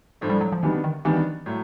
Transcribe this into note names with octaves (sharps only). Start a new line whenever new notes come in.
A2 F3 A3 D4
G3
F#3
F3
D#3 E3 G3 B3 D4
D#3
D#3 E3 G3 B3 D4
A2 F#3 A3